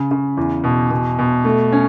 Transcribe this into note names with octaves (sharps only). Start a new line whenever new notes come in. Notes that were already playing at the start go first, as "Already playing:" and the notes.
Already playing: C#3
C#3
E2
B2
B2
B2
A3
C#4